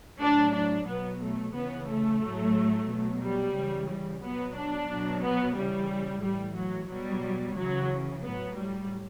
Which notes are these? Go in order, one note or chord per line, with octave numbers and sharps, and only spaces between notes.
A2 F#3 D4
D4
B2 F#3 B3
A3
C#3 E3 B3
A3
A2 F#3
B2 F#3
G3
C#3 E3
G3
B2 F#3 B3
D4
B2 F#3
B3
C#3 E3 G3
A2 E3 G3
F#3
B2 F#3 G3
C#3 E3 F#3
A2 F#3 B3
G3